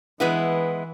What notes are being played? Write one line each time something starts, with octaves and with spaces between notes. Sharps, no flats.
E3 G#3 B3 E4